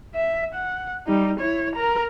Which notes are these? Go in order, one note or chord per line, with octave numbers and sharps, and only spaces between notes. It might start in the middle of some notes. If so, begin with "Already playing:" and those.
E5
F#5
G3 D#4
E4 C#5
A#4 A#5